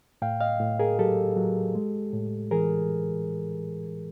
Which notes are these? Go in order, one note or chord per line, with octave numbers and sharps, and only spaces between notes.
A2 F5 G5
D#5 F5
A2
G#4 A#4
F#3 G4 A4
F#3
G#3
A2
E3 G#4 A#4